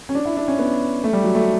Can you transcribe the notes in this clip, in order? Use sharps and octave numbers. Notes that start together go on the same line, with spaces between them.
C#4
D4
E4
D4
C#4
B3
A3
G3
F#3
A3